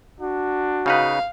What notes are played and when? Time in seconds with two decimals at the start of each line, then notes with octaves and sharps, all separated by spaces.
0.20 D4 F#4
0.86 C#3 D#4 B4 F5